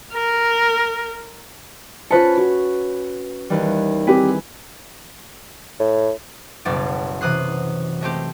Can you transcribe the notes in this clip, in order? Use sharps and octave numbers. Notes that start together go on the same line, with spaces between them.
A#4
C#4 F4 B4 C5 A5 C#7
F#4
D#2 E3 G3
C4 E4 G4 G#4 B4
A2
F#1 B1 G3 D5
C3 E3 D#6 F#6 C7
G#3 A3 C4 G4